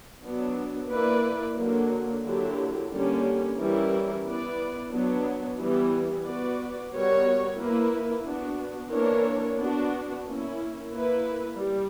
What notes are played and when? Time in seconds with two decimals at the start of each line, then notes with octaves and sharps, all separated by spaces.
0.24 F#3 B3 D4
0.91 A#3 E4 B4 D5
1.57 D3 F#3 A#3
2.24 D3 F#3 A#3 E4 G4
2.91 D3 G3 A#3 C#4 G4
3.57 E3 G3 C#4 E4 A#4
4.25 B3 E4 B4 D5
4.91 F#3 B3 D4
5.58 E3 G3 B3
6.25 B3 F#4 B4 D5
6.92 G3 B3 F#4 A#4 C#5
7.58 A#3 E4 B4
8.25 B3 D4 F#4
8.92 E3 A#3 D4 A#4 C#5
9.58 B3 D4 F#4
10.25 A#3 C#4 E4
10.92 A#3 E4 B4
11.59 G3